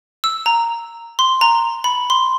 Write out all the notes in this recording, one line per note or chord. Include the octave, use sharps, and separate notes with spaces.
E6
A#5
C6
A#5
B5
C6